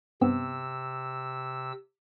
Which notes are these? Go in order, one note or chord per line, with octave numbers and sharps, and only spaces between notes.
G2 C3 B3 C4 E6